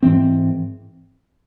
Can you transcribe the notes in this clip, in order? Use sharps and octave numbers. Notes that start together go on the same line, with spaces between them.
G#2 E3 C4